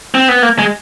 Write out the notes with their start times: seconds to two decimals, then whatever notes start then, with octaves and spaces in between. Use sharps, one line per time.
0.15 C4
0.29 B3
0.42 A#3
0.59 G#3